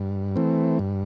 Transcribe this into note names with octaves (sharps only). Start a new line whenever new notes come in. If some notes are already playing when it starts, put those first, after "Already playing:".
Already playing: G2
E3 A3 C4
G2